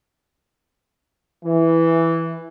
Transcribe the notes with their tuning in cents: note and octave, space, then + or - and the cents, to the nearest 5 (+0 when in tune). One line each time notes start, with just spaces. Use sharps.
E3 +0